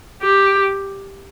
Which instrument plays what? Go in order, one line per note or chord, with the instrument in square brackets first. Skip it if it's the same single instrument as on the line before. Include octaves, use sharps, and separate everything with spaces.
[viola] G4